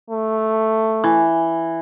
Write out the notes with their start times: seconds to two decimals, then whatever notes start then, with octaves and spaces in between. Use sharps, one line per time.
0.10 A3
1.04 E3